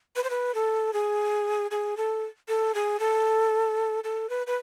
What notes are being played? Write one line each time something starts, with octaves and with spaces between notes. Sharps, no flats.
B4
C5
B4
A4
G#4
G#4
A4
A4
G#4
A4
A4
B4
B4